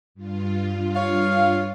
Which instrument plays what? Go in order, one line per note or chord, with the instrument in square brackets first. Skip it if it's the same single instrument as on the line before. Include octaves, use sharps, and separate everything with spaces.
[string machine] G2 F4
[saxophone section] C#5 F5